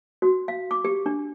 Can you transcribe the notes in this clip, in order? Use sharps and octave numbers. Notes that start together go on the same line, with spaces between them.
F#4
F5
D6
G4
D4